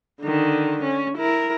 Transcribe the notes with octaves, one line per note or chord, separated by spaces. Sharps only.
D3 D#3
C#4
E4 A#4